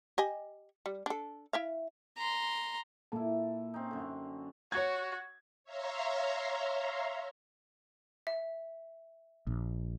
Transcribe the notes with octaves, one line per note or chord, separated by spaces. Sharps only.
G4 D#5 G#5
G3
D4 A4
E4 E5 F5
A#5 C6
A#2 A#3 E4 A4 A5
C4 C#4 D#4
F#2 D3
F#4 C#5 G#6
C#5 E5 F5 A#5 C6
E5
A#1